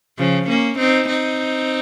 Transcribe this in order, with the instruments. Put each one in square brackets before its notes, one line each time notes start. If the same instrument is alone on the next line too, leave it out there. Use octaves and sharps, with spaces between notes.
[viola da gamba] C#3 F3
A#3 C#4
C4 D#4
C4 D#4